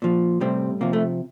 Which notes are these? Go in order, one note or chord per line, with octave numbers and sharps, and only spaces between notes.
A#2 F3
A2 C3 G3 C4
C3 F3 A#3
A3